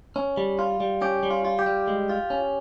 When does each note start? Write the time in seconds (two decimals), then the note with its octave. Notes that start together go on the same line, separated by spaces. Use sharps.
0.16 C#4
0.37 G3
0.59 F4
0.80 G3
1.01 C#4 G4
1.23 G3
1.30 F4
1.45 F4
1.59 G4
1.66 G3
1.88 G#3
2.09 F4
2.30 C#4